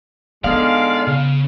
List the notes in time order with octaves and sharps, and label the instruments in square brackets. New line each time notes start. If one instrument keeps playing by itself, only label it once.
[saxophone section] G#2 D3 G#3 [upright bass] B3 [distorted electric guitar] D5 [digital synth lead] F5
[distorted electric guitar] C#3